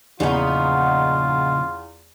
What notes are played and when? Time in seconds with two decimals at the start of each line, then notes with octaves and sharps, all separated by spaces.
0.20 E2 A#2 C#3 F3 B3 D#4 F4